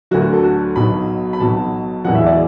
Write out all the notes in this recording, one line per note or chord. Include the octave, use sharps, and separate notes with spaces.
D2 D3 F#3 F#4
F#4
A4
F#4
B1 B2 F#3 B5
B5
B1 B2 F#3 A5
E1 E2 B2 F#3 F#5
E5
D5